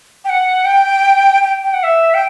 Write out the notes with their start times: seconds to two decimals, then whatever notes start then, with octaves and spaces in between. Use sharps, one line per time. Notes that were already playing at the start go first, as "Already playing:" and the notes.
0.25 G5
0.29 F#5
0.65 G5
1.43 G5
1.63 G5
1.74 F#5
1.83 E5
2.14 G5